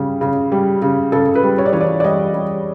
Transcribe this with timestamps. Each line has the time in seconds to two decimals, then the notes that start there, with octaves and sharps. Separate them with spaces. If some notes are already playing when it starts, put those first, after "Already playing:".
Already playing: C#3 G3
0.21 C#3
0.52 G3
0.82 C#3
1.12 C#3 A4
1.35 B4
1.43 G3
1.58 C#5
1.66 D5
1.73 E3 C#5
1.81 D5
2.00 D5
2.04 G3 D#5
2.34 G3